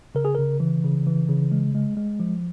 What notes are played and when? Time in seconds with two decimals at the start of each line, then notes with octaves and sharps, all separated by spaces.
0.15 C#3 A#4
0.25 G#4
0.35 C#3 A#4
0.60 E3
0.84 C#3
1.07 E3
1.29 C#3
1.52 G#3
1.75 G#3
1.97 G#3
2.20 F3